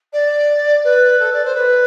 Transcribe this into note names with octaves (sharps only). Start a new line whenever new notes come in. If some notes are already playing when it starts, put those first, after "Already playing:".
D5
B4
A4
D5
C5
B4